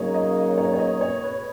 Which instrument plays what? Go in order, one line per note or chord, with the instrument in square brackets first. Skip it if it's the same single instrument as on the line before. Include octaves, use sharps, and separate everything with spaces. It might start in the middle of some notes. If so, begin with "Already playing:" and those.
Already playing: [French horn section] C#3 F#3 A#3 D#4 [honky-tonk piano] C#5 D#5
[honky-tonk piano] D#5
C#5
C#5
D#5
C#5
B4